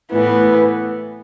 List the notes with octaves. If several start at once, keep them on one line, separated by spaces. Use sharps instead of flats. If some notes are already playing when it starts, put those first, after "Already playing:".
A2 E3 B3